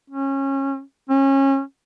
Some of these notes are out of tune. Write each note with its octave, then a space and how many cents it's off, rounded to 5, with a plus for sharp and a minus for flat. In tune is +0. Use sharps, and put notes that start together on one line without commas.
C#4 -25
C#4 -25